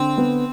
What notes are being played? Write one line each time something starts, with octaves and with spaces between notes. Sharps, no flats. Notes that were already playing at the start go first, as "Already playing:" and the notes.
Already playing: D3 C4
B3